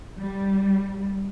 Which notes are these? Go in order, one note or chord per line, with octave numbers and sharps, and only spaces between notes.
G3